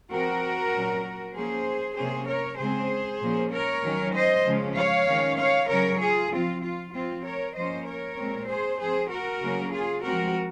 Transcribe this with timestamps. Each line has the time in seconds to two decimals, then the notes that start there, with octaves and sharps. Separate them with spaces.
0.11 F3 C4 F#4 A#4
0.73 A#2 F#3 C#4
1.35 F3 A#3 C#4 G#4 C5
1.97 C3 F#3 A#3 C#4 G#4 C5
2.28 A#4 C#5
2.59 C#3 G#3 C4 G#4 C5
3.21 A#2 F3 A#3 C#4
3.52 A#4 C#5
3.83 D#3 F#3 C#4
4.14 C5 D#5
4.45 C#3 F3 G#3 C#4
4.76 C#5 F5
5.07 D#3 G#3 C#4
5.38 C#5 F5
5.70 C#3 F#3 C#4 A#4 C#5
6.00 F4 G#4
6.31 F3 C4 F4
6.63 F4
6.93 F3 C4 F4
7.24 A#4 C#5
7.55 F3 A#3 C#4 C5 D#5
7.86 A#4 C#5
8.17 A#2 G#3 C4
8.48 G#4 C5
8.79 F3 C4 G#4 C5
9.10 F#4 A#4
9.41 C#3 F#3 A#3 C#4
9.73 F4 G#4
10.03 F3 G#3 C4 F#4 A#4